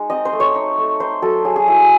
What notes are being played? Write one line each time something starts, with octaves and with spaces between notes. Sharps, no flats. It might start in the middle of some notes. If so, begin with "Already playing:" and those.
Already playing: G#3 D#4
C4 D#5
C5
A3
C#5
D#4
A3
D#4 C5
F#3 A4
F#3 G#4
G#4
E4 G#4
G#4